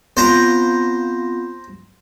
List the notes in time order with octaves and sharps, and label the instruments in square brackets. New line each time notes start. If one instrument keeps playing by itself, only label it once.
[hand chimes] B3 C4 F4 [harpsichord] C5 A#5